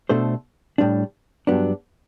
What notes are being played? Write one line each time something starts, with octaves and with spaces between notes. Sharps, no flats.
B2 A3 D4 A4 C5
A2 G3 D4
G2 F#3 B3 D4